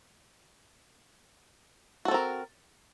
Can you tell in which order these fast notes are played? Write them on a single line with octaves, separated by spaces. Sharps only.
F#4 A4 C4 A#4